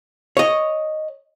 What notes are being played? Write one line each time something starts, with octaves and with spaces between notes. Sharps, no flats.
C#5 D#5